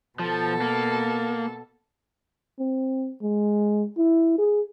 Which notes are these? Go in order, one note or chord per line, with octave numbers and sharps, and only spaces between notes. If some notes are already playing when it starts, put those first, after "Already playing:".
B2 F3 A4
A#3
C4
G#3
E4
G#4